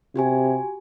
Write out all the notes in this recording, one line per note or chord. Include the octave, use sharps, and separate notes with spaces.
C3 F#4 G4 G#5